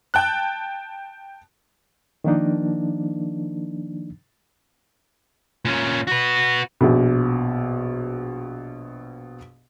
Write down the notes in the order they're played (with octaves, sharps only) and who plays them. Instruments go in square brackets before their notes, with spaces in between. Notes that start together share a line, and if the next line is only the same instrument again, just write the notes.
[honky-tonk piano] G5 A5 F#6
[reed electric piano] D#3 F3 A#3 D4 D#4
[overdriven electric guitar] A#2 C#4
F#4 B4
[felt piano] A#1 B2